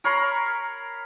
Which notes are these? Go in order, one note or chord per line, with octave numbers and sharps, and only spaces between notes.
A#4 C#5 B5 C6